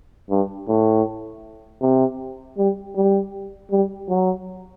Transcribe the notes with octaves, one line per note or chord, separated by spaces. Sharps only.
G2
A2
C3
G3
G3
G3
F#3